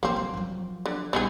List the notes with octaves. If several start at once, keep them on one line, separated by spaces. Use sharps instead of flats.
F3 F#3 A#3 C4
F3
F3 F#3
D3
A#1 G3 B3 D#4 G#4